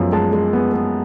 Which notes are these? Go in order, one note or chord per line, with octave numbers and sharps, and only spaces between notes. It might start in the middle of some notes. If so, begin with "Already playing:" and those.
Already playing: F#2 F3 G#3 B3
G#3 A5
G#3
B3
B3